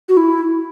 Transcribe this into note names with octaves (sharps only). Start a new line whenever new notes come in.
F#4
E4